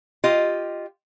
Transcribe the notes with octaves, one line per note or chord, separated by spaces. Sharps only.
F4 G4 D#5